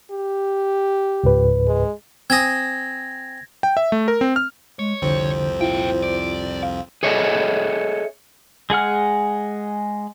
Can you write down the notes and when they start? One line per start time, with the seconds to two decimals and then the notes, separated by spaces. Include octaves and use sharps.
0.11 G4
1.24 C#2 G#2 B4
1.67 G#3
2.30 C4 G#5 D#6 G#6 A#6
3.63 G5
3.77 E5
3.92 A3
4.08 A#4
4.21 C4
4.36 F6
4.79 G#3 C#5
5.02 C2 F2 D3 C4 C5
5.61 A#2 E4 F4 G5
6.03 D5
6.63 F5
7.03 G#4 A4 C#5 D#5 E5
8.70 G#3 G#4 F#5 F6